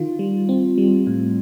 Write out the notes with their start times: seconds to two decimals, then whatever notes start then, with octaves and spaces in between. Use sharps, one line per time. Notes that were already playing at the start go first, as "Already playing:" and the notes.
Already playing: D#3 F4
0.19 G3
0.49 C4
0.78 G3
1.07 A2